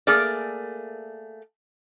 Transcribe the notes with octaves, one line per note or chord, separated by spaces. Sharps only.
A3 A#3 G#4 A#4 D5